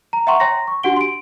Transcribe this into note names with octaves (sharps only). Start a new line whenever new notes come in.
A#5
E5 F#5 G5 A#5 C6 C#6
C#5 G5 A#5 C6 A#6
C#6
D4 F#4 G4 F#5 D7 G7
C6 D7